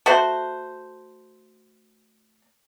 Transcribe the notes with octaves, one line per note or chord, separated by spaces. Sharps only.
A3 F#4 C5